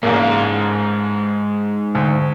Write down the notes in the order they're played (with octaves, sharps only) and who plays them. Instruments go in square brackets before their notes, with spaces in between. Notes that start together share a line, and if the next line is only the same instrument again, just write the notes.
[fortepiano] A1 C#3 A#3 [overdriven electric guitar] G#2
[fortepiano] D2